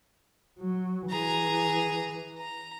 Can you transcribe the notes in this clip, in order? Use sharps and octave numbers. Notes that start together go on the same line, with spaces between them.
F#3
E3 G#4 A#5
A#5